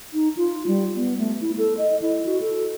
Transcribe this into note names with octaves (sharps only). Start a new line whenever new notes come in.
D#4
F4
G3
B3
A3
E4
A4
D#5
E4
F#4
A4